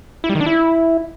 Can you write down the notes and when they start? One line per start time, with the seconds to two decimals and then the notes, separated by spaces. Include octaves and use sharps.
0.24 E4
0.29 G3
0.35 D#3
0.41 D4
0.46 E4